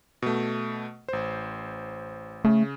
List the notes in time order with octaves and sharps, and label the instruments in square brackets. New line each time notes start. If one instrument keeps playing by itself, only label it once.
[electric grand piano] B2 A3
A1 C5
[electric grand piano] C#3 [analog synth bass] A3